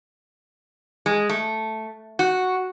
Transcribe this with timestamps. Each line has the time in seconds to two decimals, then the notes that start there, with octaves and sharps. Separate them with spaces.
1.06 G#3
1.29 A3
2.19 F#4